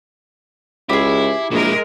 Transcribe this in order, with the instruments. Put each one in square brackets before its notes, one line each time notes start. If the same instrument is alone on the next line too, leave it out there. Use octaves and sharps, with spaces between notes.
[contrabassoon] C#2 [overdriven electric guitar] E4 [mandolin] G4 G#4
[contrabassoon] A#1 [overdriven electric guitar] B2 E4 [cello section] G#3 A#4